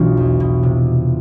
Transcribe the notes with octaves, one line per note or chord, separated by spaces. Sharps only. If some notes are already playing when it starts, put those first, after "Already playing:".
Already playing: B1 B2 E3 D4 F4
E2
B2
C3